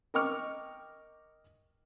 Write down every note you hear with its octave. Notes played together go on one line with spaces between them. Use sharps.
A#4 D#5 G5 C#6 D6 F6